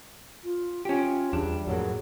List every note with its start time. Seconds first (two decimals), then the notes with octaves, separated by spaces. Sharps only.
0.43 F4
0.85 C#4 F4 G4
1.33 E2 G3 D4
1.67 F2 A2 F#3 A#3 G#4